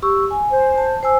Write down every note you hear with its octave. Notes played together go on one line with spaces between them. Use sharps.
G4 C#6 E6
G#5
C5
A5
C5 G#5 E6